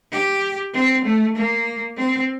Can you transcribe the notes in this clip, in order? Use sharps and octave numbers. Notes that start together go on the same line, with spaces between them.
G4
C4
A3
A#3
C4